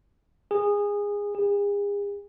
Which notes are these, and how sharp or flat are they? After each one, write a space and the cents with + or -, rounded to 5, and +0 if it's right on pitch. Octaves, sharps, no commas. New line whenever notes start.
G#4 -20
G#4 -40